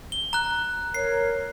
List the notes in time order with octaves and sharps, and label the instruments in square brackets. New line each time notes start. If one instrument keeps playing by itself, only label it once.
[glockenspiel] G7
A#5 F#6
[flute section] A#4 C#5 [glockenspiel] C7